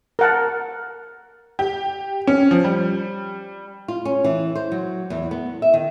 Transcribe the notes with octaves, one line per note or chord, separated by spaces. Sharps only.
A#4 F#5 A5
G4
C#4
F3
G3
F4
C#4
E3
C5
F#3
E2
B3
E5
D#3